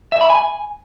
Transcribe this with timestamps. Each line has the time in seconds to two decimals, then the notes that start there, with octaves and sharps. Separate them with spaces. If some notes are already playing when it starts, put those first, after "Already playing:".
0.12 E5
0.21 B5
0.30 G#5